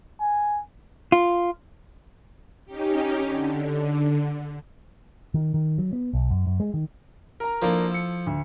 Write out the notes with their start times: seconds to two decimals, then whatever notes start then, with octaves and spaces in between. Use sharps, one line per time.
0.21 G#5
1.12 F4
2.65 C#4 D#4 G4
3.20 D3
5.34 D#3
5.54 D#3
5.78 F#3
5.93 B3
6.13 B1
6.30 F#2
6.47 F#2
6.60 G#3
6.74 D#3
7.40 A#4 A#5
7.62 F3 A#3 D4 E4 A4 A#4
7.91 E6 C#7
8.27 D2